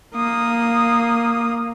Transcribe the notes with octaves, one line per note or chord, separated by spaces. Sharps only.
A#3 D#6